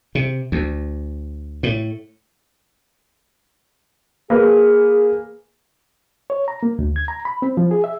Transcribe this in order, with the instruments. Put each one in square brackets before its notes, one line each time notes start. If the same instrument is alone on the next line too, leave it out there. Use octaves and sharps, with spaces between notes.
[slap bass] C3
D2
A2
[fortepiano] A#3 B4 [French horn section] G#4
[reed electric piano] C#5
A#5
A#3
D2
G#6
A#5
B5
C4
F3
G#4
E5